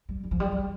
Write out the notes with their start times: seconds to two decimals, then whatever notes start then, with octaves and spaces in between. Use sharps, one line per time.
0.09 G3
0.23 G3
0.31 F3
0.40 G3
0.52 G3